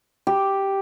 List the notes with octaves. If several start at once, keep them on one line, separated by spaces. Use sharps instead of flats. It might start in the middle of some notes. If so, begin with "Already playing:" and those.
G4